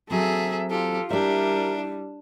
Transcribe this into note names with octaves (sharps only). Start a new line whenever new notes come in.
F#3 C4 G#4 A4 E5
F4 G4 A4
G3 D4 E4 G4 A#4 E5